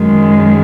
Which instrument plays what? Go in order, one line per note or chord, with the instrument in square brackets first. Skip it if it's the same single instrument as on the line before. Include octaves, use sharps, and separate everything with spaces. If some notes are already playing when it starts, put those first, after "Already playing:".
Already playing: [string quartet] F#2 D#3 G#3